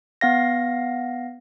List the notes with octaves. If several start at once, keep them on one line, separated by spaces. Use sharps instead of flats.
B3 F5 A#6